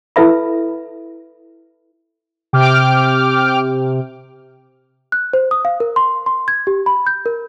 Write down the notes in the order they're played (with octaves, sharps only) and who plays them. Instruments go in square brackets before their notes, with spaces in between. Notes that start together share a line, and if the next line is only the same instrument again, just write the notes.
[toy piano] E4 A4 B4 E5 B5
[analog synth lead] C3 [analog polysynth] G5 D6 F6
[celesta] F#6
C5
D#6
F5
A#4
C6
C6
G#6
G4
B5
G6
A#4